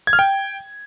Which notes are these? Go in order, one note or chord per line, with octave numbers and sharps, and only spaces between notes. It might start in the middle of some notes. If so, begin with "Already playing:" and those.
G#6
F6
G5